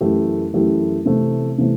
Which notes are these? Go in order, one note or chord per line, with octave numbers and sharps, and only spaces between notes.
F#2 E3 A3 E4 G4
F#2 E3 A3 E4 G4
C3 E3 A3
C3 E3 A3